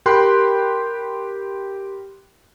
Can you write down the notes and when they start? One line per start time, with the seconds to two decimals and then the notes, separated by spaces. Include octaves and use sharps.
0.06 G4 A#4 G5 B5 C6 F#6